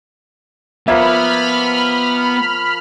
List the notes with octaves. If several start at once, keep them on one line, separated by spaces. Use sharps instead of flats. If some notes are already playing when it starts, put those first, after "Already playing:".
F3 A#3 B3 E5 B5 F6